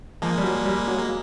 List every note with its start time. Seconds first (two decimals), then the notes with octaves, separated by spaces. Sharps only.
0.22 F3 G#3 A#3
0.38 G3
0.44 F#3
0.66 G3
0.88 F#3
0.99 A#3